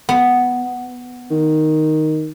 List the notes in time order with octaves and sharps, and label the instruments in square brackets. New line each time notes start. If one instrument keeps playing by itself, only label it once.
[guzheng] B3
[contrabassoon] D#3